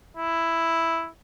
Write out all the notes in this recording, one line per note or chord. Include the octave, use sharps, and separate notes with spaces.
E4